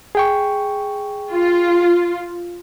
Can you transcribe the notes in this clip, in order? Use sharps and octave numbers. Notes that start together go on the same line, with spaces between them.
G#4 G5 C#6
F4